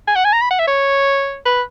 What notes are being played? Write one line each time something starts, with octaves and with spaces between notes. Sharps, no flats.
G#5
F#5
G#5
A#5
B5
F#5
E5
C#5
B4